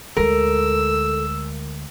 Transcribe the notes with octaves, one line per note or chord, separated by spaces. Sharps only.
D2 G#3 A4 A#4 E6